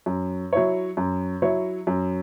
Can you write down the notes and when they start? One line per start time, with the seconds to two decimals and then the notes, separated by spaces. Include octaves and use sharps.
0.06 F#2
0.53 F#3 E4 C#5
0.97 F#2
1.42 F#3 E4 C#5
1.87 F#2